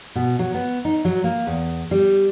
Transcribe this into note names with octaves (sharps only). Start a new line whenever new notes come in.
B2
F#3
B3
D#4
F#3
A#3
E2
G3